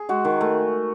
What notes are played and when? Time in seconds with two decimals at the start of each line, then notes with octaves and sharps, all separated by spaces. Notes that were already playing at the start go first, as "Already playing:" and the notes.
Already playing: G#4
0.09 G#3 F#4
0.25 D#3
0.41 A3